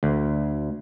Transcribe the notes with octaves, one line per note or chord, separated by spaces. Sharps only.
D2